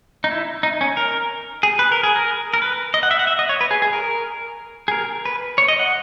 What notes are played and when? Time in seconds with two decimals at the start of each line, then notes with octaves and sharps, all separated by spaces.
0.24 D#4
0.31 E4
0.63 D#4
0.81 C#4
0.97 A#4
1.63 G#4
1.79 B4
1.92 A#4
2.03 G#4
2.16 A#4
2.54 A#4
2.62 B4
2.94 D#5
3.03 F#5
3.11 E5
3.19 F#5
3.27 E5
3.39 D#5
3.49 C#5
3.61 B4
3.71 G#4
3.82 G#4
3.93 A#4
4.88 G#4
4.91 A#4
5.25 B4
5.58 C#5
5.68 D#5
5.79 F#5